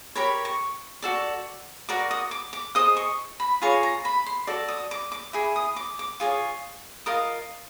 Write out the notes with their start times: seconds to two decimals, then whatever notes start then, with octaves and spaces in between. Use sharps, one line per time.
0.15 G4 A#4 C#5 B5
0.45 C#6
1.02 F#4 A4 D5
1.89 F#4 A#4 D5 D6
2.11 D#6
2.31 D6
2.53 D6
2.75 G#4 C5 D#5 D#6
2.97 C#6
3.40 B5
3.62 F4 G#4 C#5 A#5
3.83 A#5
4.05 B5
4.26 C6
4.47 F#4 A4 D5
4.69 D#6
4.91 D6
5.12 D6
5.33 E4 G#4
5.56 D#6
5.76 D6
5.99 D6
6.20 F4 G#4 C#5
7.06 F4 A#4 D#5 D#6